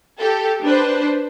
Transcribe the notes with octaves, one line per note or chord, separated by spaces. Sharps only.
G4 A4
D4 B4 C5